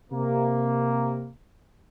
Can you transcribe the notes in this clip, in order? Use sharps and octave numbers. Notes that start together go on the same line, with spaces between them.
C3 A#3